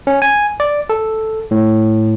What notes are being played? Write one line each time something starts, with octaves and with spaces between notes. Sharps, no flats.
C#4
G#5
D5
A4
A2